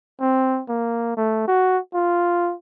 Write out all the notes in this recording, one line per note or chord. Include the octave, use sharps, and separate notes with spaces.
C4
A#3
A3
F#4
F4